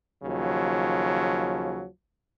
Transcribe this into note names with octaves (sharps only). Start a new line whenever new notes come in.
D#2 C#3 F3 F#3